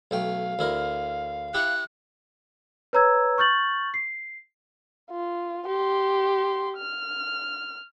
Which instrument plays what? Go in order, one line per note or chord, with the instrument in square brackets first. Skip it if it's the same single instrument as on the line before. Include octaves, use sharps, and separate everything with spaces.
[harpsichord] B1 A3 G5 [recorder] F5
[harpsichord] D2 E4 A#4
[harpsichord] E4 G4 [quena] F#6
[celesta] B4 C#5 A#5 E6 G#6
C#6 F6 G6 A6 F#7
C7
[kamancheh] F4
G4 C6
F6